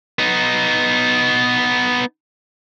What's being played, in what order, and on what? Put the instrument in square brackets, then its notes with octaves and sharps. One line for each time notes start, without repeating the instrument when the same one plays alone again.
[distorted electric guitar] B3 D#4